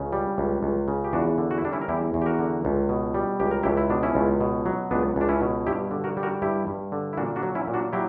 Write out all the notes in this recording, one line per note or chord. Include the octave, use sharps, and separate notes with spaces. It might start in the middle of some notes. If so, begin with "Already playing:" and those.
Already playing: C#2 C#3
G3
C#2
C#2
C#3
G4
E2 D4 F#4
D3
F#4
E4
G3 D4
C#4 E4
A#4
E2 E4 G4
E2
G4
F#4 A#4
D3
C#2
B2
G3
C#2 G4
A#4
C#2 E4 G4
E4
B2 D4
C#4 E4
C#2
B2
F#3
C#2 B3 D4
C#2 D4
C#4 E4
B2
G2 E4 G4
D3
F#4 A#4
G3
F#4 A#4
G2 E4 G4
G2
D3
E4
A#2 D4 F#4
D4 F#4
F#3
C#4 E4
A#2
D4 F#4
F#3 E4 G4